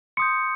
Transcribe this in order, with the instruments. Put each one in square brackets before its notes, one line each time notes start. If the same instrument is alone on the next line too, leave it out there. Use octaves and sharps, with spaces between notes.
[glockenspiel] C6 D#6 G6 C#7